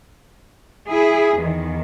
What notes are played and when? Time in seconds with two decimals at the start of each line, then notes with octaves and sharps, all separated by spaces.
0.89 E4 G#4
1.37 E2 D#3